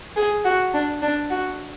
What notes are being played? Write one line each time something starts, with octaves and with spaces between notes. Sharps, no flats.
G#4
F#4
D4
D4
F#4